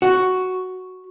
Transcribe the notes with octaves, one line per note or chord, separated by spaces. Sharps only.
F#4